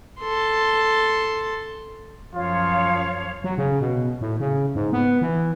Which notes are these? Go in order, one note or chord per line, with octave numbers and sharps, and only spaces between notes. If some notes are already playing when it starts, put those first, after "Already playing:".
A4 C6
F#2 F3 F4 C#5 F5
F#3
C#3
B2
A2
C#3
G#2
B3
E3